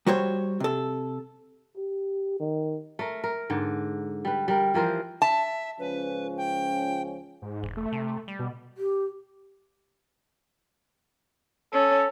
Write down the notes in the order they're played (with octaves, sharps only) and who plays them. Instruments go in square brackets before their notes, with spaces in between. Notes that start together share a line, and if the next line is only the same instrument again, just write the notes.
[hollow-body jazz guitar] G3 F#4 C5 C#5
C3 A4
[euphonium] G4
D#3
[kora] A3 A#4
A#4
G#2 D3
G3 B4
G3 A#4
E3 F3 A#4 C5
[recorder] E5 [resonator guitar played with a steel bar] A5
[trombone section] C#2 F3 C#4 [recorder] B4
[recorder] G5
[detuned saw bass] G#2
[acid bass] E1
[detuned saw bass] A3
[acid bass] C3
G3
[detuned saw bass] B2
[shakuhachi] G4
[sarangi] C#4 [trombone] A4